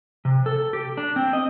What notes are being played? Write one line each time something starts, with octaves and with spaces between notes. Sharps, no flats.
C3
A4
G4
D4
C4
D#5